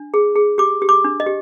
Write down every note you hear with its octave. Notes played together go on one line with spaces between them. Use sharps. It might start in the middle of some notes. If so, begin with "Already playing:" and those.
Already playing: D4
G#4
G#4
G4 D6
G4
D6
D4
D#5
G4